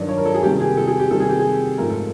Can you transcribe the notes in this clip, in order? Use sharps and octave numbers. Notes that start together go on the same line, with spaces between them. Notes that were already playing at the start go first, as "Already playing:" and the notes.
Already playing: G2 D#3 F#3 D5
C#5
A#4
A4
G#4
C3 D#3 G3 G4
G#4
A4
G#4
G4
C3 D#3 G3 A4
G#4
G4
G#4
G#2 F3 A3 A#4
A4